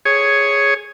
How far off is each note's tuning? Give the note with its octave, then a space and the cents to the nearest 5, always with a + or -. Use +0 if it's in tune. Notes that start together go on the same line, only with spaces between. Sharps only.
G#4 +0 C#5 +0